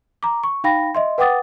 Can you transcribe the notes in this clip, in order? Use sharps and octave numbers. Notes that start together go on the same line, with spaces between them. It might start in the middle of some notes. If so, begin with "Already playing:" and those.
A#5 D6
C#6
D#4 F5 G5 B5 A#6
D#5 E5 C6
B4 F#5 G5 D6 D#6 A6